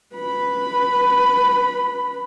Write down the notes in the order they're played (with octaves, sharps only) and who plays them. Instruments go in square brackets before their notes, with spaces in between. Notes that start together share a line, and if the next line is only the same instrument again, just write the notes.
[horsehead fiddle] B4 B5